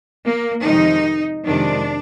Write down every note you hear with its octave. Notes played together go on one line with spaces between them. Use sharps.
A#3
F2 C3 D#3 G#3 D#4
F2 C3 D#3 G#3 D4